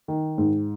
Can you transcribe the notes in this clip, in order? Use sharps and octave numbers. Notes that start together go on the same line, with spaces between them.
D#3
G#2